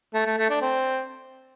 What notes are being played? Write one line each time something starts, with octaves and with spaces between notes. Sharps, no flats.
A3
A3
A3
D4
C4